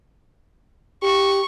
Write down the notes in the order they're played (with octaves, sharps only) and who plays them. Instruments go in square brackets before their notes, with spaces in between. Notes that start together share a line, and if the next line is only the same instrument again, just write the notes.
[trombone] G4 [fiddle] C#6